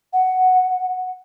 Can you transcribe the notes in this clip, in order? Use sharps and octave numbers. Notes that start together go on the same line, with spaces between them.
F#5